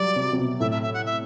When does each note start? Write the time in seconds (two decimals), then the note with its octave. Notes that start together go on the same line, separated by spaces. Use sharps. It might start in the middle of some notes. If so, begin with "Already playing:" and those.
Already playing: F#3 G3 D5
0.16 C3
0.33 C3
0.38 B2
0.60 A2 E5
0.71 E5
0.82 E5
0.94 F#5
1.06 E5